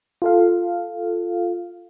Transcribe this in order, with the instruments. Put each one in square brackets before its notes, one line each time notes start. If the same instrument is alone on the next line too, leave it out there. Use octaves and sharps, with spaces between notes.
[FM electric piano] F4 A4 F5